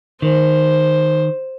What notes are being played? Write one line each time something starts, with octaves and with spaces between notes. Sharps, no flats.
D#3 C5